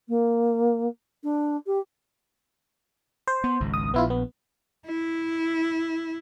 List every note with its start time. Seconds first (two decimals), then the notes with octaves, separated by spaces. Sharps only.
0.09 A#3
1.24 D4
1.67 G4
3.27 C5
3.44 B3
3.60 G#1 C#2
3.74 D#6
3.94 A#1 B3 E4 F4
4.10 B3
4.86 E4